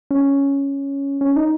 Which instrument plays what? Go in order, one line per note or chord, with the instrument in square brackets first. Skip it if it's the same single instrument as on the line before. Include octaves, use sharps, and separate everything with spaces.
[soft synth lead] C#4
C#4
D#4